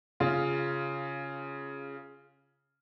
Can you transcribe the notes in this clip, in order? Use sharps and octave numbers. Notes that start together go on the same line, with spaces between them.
C#3 F4